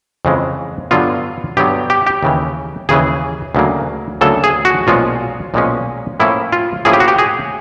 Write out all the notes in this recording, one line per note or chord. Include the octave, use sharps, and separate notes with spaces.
F2 C#3 E3 G#3
G2 D3 F#3 B3 F4
G2 D3 F#3 B3 G4
G4
G4
D#2 C#3 E3
D#2 C#3 E3 G#4
D2 C#3 F#3 A#3
D2 C#3 F#3 A#3 A4
G#4
F#4
B1 A#2 F3 G#3 C#4 F4
B1 A#2 F3 G#3 C#4
A2 F3 A#3 C#4 E4
F4
A2 F3 A#3 C#4 E4 G#4
G4
F#4
G4
G#4